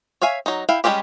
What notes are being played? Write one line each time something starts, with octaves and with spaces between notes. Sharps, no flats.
C#5 E5 F5 G#5
F#3 D#4
E4 F5 G5
G3 G#3 C4 C#4 G4